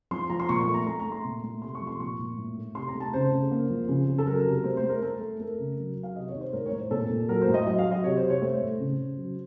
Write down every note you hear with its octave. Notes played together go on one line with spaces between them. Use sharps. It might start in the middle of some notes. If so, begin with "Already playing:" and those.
F3 C6
F3 A#5
C6
A#2 C#6
C#6
A3
A#5
A3 A#5
A#5
A3
C6
A#2
A3
C3 C6
C#6
F3
C6
A#2 C#6
A#2
A2
A3
C3 C6
A#5
A3
A5
C#3 C5
C#3
A#3
F3
C#3
C#3
A4
F#3 A#4
A#4
C3
A#4
A3 C5
C5
A3
A#4
A3 A4
A3
A3 A#4
C#3
F#3
F#3
F5
C3 D#5
C#5
D#3
C5
A2 A#4
C#5
A2
C5
A#2 A4
A#2
F#3 A#4
C5
A2
D#5
F#3 D#5
F5
F#3
D#5
C3 C#5
C5
C3
C#5
A3 C5
A2
C#3
C#3
F#3